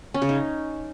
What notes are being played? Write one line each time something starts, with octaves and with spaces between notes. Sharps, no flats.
C#4
C#3
D#4